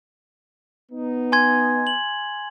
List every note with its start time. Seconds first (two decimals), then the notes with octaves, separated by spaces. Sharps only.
0.91 B3 D#4
1.32 G#5 C6 G#6
1.87 F#7